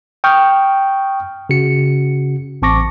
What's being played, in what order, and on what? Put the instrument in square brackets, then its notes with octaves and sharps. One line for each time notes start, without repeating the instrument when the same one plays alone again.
[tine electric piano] G5 C#6 D#6 F6 G6
C#3 F#4 C#7
A1 C4 A5 C#6 D6 A#6